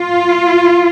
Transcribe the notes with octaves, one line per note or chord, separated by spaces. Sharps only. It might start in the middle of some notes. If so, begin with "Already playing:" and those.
Already playing: F4